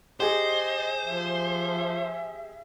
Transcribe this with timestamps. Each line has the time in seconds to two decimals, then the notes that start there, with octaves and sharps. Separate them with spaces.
0.20 G4 G#4 C5 D#5
1.06 F3 E5